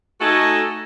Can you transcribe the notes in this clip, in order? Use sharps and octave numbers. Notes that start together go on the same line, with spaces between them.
A3 D#4 F#4 A4 D#5 G#5